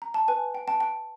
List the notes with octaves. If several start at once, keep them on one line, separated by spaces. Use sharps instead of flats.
A#5
A5
B4 G#5
G5
G5 A5
G5